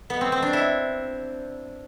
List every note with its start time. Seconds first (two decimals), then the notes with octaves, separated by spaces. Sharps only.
0.10 B3
0.21 C4
0.32 C4
0.42 D4
0.53 E4